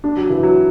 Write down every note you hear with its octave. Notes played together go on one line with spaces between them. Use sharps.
D4
F#3
E3
F#3